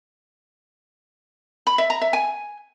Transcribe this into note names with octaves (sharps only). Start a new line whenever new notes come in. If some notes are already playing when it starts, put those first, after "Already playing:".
B5
E5
A#5
E5
G#5